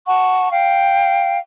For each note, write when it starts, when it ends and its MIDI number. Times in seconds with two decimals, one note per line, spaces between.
0.07 0.48 78
0.07 0.48 81
0.07 0.48 85
0.51 1.37 77
0.51 1.37 79